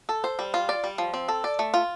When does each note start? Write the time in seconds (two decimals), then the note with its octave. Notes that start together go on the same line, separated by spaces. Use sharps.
0.09 A4
0.24 C5
0.39 G3
0.54 F4
0.69 D5
0.84 G3
0.98 F3
1.14 C4
1.28 A4
1.44 D5
1.59 A3
1.74 F4